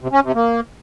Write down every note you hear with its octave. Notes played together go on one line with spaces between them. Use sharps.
C3
C#4
C3
A#3